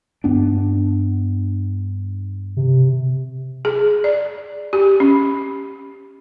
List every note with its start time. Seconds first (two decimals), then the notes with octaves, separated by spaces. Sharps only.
0.24 G2 B3 D4
2.57 C3
3.65 G#4
4.04 D5
4.73 G4
5.00 C#4